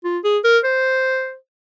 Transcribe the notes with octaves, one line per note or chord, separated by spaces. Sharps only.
F4
G#4
A#4
C5